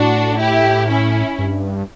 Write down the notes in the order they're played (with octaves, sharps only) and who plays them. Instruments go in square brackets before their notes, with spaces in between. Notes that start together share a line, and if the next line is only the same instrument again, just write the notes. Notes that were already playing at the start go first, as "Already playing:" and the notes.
Already playing: [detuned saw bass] A2 [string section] D4 F#4
[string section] E4 G4
C#4 E4
[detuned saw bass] G2